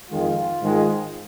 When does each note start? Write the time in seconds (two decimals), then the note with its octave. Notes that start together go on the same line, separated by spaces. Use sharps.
0.10 F2 D#3 G#3 F4
0.63 G#2 D#3 G#3